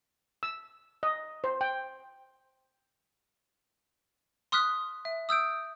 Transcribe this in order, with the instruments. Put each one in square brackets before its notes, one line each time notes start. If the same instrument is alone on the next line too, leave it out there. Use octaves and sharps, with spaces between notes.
[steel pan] E6
D#5
C5
G5
[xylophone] C6 D#6 F6 F#6 B6
E5
D#6 E6 G6 D7